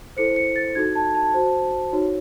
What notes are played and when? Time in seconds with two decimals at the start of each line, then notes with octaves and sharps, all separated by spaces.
0.17 E4 A4 C5 C#7
0.36 C#7
0.56 A6
0.75 D#4 F#4 A4 G#6
0.95 A5
1.15 A5
1.34 F#4 C5
1.93 D#4 F#4 C#5